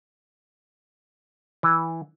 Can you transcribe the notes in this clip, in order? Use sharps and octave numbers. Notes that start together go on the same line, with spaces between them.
E3